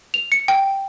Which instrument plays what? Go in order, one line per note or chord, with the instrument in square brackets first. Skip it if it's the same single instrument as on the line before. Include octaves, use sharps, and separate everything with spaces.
[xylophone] F7
C#7
G5